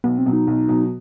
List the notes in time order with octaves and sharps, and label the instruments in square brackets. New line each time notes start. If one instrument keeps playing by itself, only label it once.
[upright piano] B1 [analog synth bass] B3
[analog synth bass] C4
[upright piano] B2 F#3
[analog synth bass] D#4
[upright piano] B1
B2 F#3